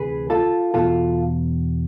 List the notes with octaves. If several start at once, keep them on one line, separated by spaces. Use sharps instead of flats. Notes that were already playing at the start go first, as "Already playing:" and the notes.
Already playing: D2 C3 E3 G#4 B4
F4 A4
E2 B2 F4 A4